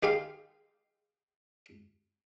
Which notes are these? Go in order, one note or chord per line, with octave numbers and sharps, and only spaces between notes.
D#3 G4 G#4 F5 C6